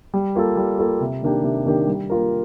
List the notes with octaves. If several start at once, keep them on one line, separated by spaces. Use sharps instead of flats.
G3
A#3 F4 A4
G3
A#3 F4 A4
C3
D#3 A#3 D4 G4
C3
D#3 A#3 D4 G4
G3
A#3 F4 A#4